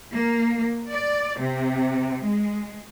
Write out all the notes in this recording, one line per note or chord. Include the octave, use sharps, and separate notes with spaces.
A#3
D5
C3
G#3